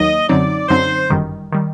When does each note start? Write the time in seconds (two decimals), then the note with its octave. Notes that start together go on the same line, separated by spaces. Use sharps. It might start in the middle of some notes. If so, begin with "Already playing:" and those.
Already playing: D#2 D#3 F#3 A#3 D#4 D#5
0.29 F#2 D3 F#3 C4 D#4 D5
0.69 F#2 D3 F#3 C4 D#4 C5
1.10 G1 F#2 D#3 G3
1.52 D#3 G3